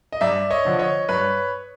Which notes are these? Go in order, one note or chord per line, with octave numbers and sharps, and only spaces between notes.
D#5
G2 D5 E5
C#5 D#5
D3 F3
C#5 D#5
G2 B4 C#5